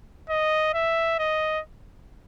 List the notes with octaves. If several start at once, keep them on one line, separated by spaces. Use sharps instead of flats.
D#5
E5
D#5